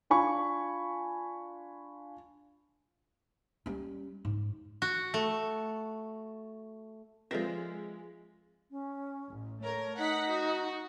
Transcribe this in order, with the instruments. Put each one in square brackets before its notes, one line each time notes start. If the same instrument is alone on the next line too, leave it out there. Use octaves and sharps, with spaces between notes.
[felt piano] D4 F4 G#5 B5 C#6
[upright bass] G3 C#4
G#2
[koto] F#4
A3
[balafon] F3 A4 B4 [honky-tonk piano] G#3 A#6 [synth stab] C4 [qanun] F4 E5
[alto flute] C#4
[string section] A1
[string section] A3 A#4 [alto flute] C#5
[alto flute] D#4 [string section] F#5 B6
[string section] F#4